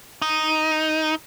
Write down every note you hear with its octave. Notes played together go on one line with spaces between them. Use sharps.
D#4